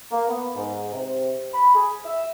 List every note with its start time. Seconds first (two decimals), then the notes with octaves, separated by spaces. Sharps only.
0.12 A#3
0.29 B3
0.56 G#2
0.93 C3
1.54 B5
1.75 G#4
2.05 E5